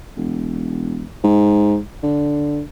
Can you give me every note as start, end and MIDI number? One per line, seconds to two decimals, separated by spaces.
0.17 1.06 28
1.24 1.78 44
2.03 2.62 50